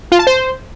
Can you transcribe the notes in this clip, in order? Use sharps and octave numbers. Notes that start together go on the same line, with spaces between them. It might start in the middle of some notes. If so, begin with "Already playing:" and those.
F4
A5
C5